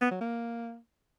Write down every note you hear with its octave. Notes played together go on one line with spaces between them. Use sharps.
B3
F#3
A#3